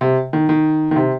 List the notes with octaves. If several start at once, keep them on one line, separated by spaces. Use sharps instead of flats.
C3
D#3
D#3
D#3
C3